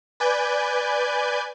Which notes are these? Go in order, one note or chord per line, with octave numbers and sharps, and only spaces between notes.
B4 D5 G#5 G6